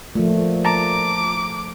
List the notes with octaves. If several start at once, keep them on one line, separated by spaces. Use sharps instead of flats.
A#2 F3 A3
A5 A#5 D6